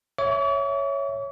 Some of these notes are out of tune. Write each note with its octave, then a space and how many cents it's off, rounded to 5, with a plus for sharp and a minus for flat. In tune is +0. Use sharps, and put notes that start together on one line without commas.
C#5 +0 E5 +0 C#6 +45